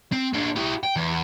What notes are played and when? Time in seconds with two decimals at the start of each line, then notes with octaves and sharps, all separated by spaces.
0.12 C4
0.34 A#3 D4
0.56 E4 G4
0.84 G5
0.96 E2